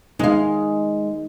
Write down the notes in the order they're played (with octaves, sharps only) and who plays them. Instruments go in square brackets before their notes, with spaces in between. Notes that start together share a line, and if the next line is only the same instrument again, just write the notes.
[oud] G#3 F5 [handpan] D#4